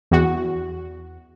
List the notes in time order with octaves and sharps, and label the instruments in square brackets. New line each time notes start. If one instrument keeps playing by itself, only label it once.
[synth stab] E2 F#4